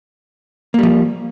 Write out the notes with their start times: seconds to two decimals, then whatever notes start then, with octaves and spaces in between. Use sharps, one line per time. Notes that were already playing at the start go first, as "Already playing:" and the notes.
0.74 A#3
0.79 G3
0.83 F3